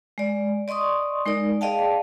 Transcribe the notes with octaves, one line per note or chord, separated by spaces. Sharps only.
G#3 D5
D5 D#5 C6 C#6 D#6
G#3 D#4 A#4 D5
G#4 D5 D#5 F5 G5 A5